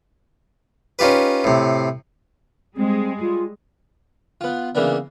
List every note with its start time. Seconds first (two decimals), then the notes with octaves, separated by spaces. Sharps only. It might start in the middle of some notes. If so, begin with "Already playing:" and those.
0.99 C#4 D#4 F4 G4 B4
1.44 A2 C3
2.76 G3 G#3 C4 G#4
3.21 F4
4.41 B3 F4
4.75 C#3 E3 A#3 B3 D4